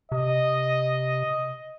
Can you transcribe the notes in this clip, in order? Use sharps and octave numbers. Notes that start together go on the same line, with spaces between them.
C3 D#5